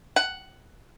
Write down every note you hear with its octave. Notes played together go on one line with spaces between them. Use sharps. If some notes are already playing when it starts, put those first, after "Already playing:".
F#5